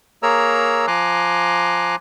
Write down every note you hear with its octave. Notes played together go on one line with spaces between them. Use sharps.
A#3 G#4 A#4 C#5 A#5 E6
F3 G#5 A#5 C6 D6 F#6